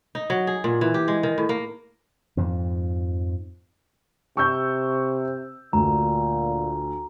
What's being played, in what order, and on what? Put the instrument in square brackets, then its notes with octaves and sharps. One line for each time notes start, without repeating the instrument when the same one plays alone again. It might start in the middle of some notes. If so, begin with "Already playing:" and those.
[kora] D#4
F#3
G#4
A#2
E3
G4
G#3
D#3
A2
A#3
[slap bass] F2 G#2 F3
[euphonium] C3 [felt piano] C#6 E6 G6
[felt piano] D2 [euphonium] A#2 [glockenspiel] A#5